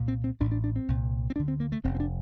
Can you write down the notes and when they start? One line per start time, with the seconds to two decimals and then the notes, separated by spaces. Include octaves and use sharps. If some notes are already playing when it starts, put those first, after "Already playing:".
Already playing: C2 A#2
0.08 C4
0.24 C4
0.40 A1 A2 D4
0.52 D4
0.64 D4
0.76 C4
0.88 C2 A#2
1.30 C4
1.36 D2 D3 D4
1.48 C4
1.60 A#3
1.72 A3
1.84 F1 F2 C3 C4
1.95 C4
2.00 D4